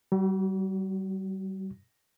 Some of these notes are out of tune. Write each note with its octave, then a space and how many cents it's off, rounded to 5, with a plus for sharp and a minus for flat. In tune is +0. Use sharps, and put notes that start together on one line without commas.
G3 -35 F#4 +20